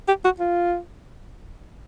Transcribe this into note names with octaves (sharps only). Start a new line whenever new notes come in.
G4
F#4
F4